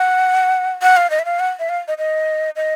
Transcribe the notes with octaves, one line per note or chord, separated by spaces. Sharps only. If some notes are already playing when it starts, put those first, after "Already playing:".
Already playing: F#5
F#5
F5
D#5
E5
F5
F#5
E5
F5
D#5
D#5
D#5